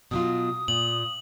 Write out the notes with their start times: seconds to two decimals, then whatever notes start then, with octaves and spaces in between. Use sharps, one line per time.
0.11 B2 F#3 F4 D#6
0.68 A#2 F#7